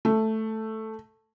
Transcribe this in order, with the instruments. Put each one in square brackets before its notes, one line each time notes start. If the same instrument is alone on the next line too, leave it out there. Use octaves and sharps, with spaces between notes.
[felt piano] A3